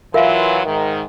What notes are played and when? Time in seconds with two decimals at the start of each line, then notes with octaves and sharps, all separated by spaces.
0.14 E3 F#3 F4 A#4 E5 F5
0.65 G#2 D#3